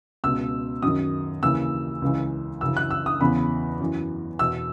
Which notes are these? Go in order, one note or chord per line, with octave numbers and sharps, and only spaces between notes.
C#2 B2 E6
F#2 D#3 D#6
D#2 C#3 E3 E6
C#2 C#3 E3
F#2 C#3 E3 E6
F#6
E6
D#6
E2 C#3 E3 B5
F#2 E3
E2 B2 E6